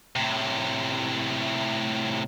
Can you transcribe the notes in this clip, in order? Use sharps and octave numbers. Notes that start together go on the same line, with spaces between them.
A2 C3